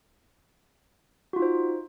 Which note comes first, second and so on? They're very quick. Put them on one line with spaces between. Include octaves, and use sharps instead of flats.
F#4 F4 D#4 C5